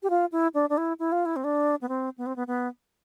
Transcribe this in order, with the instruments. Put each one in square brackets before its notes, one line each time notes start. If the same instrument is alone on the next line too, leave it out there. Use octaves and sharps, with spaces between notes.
[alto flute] G4
F4
E4
D4
D4
E4
E4
F4
E4
C4
D4
B3
C4
B3
C4
B3
B3